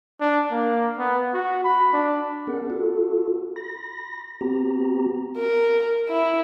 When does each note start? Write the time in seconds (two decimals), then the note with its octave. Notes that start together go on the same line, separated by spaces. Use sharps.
0.20 D4
0.51 A#3
0.99 B3
1.34 F#4
1.64 B5
1.93 D4
2.47 B3 C#4 G#4 A#4 F#5
2.70 F4 F#4 A4
3.56 B5 A#6
4.41 B3 C4 F#4 G4 A#5
5.37 A#4
6.09 E4